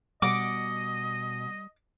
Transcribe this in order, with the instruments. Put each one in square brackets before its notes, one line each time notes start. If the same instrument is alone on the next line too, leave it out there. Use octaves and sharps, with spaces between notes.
[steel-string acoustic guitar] B2 F#5 [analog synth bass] G3 [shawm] D#5 [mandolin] D6